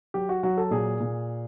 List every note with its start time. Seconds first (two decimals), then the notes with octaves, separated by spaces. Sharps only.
0.14 F#3 G4
0.29 F#4
0.43 F#3 F#4
0.57 A4
0.71 A#2 G#4
1.00 A#2